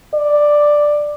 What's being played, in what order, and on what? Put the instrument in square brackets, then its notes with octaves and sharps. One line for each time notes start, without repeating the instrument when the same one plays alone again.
[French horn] D5